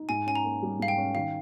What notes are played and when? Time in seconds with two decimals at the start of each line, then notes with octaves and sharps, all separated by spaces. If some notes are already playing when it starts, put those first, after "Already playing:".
Already playing: D#4
0.09 G#2 G#5
0.27 C#4 G#5
0.35 A#5
0.45 A#3
0.63 G3
0.79 G#2 F5
0.88 G5
0.98 C#4
1.15 D#3 F5